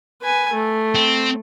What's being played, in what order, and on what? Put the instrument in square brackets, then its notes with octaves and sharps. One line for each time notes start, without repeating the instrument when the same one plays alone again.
[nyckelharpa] B4 G#5
A3
[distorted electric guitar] C4